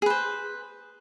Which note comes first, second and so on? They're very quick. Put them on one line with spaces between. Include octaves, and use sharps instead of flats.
G#4 B4 C5